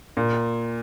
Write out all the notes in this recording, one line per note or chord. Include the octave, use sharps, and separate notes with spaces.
A#2